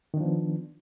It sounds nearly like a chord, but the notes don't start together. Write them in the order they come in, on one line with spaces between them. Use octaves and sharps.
D#3 D4 F3 B3